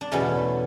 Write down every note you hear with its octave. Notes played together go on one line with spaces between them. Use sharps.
D4
E2 B2 A3 C#4